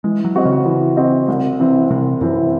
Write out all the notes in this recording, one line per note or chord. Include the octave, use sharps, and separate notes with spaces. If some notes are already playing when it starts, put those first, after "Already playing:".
E3 G#3
F#3
C4 F#4 C5 D#5
C#3
E3
C4 F#4 C5 D#5
C2
C3 E3 C4 E4
C2 C3
F#2 C3 E3 C4 E4